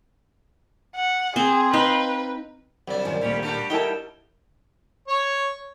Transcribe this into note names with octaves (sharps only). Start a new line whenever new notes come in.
F#5
C4 G#4
D#4 B4 F5
C2 F#3 D4
F#2 D#3 F3
D2 A#2 D#3 G3 C#4
G3 D4 F#4
D#4 E4 A4 A#4 C#5 G5 A5
C#5